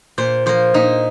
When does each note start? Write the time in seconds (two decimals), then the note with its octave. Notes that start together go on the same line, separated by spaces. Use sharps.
0.18 A#2 C5
0.46 F3 A#3 C5
0.74 A#2 D#4